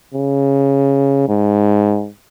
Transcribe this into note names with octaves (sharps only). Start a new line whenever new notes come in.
C#3
G#2